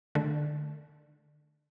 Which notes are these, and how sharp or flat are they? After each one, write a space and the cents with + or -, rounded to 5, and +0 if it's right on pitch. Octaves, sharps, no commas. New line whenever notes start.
D3 +20 A3 -25